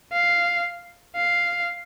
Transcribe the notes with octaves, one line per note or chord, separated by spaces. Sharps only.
F5
F5